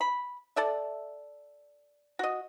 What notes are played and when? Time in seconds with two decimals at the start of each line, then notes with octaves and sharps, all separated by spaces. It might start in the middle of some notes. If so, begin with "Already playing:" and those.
0.01 B5
0.56 A4 D5 E5
2.19 F#4 D#5